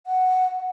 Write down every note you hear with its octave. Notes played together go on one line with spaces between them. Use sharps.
F#5